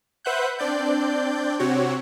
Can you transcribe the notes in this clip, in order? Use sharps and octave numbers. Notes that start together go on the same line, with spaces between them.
B4 C5 E5 F#5 F#6 G6
C4 D4 D5 G6
C3 C4 F#4 C#5